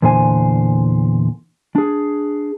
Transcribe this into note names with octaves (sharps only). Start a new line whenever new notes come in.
E2 A#2 D3 E3 C5 G#5
D4 G#4